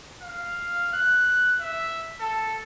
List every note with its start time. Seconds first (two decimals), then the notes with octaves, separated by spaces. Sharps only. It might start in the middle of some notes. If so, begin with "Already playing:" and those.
0.22 F5
0.93 F#6
1.60 E5
2.20 A4